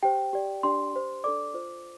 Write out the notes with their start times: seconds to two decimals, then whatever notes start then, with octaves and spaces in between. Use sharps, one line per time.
0.03 G4 C5 G5
0.33 G4 D5
0.63 D4 G4 D5 C6
0.93 G4 C5
1.24 D4 A4 D5 D6
1.54 F4 C5